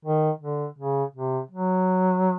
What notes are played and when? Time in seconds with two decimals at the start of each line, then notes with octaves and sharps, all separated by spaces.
0.05 D#3
0.40 D3
0.78 C#3
1.15 C3
1.51 F#3